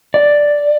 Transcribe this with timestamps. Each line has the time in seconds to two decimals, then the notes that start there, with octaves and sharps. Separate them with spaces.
0.14 D5